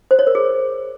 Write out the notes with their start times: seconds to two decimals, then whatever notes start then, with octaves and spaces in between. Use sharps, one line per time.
0.11 C5
0.19 C#5
0.27 A#4
0.35 G#4